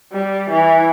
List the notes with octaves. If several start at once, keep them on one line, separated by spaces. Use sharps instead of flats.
G3
E3